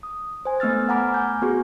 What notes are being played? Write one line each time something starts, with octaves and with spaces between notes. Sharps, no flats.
D#6
C5 G#5
A3 B3 E6 F6 A6
F#5 G#5 A#5 B5 D6 F6
G#5 G6
B3 F#4 G#4